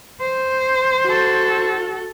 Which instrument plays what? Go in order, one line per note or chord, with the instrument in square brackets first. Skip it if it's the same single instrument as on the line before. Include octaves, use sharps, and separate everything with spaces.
[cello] C5
[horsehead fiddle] F#4 A4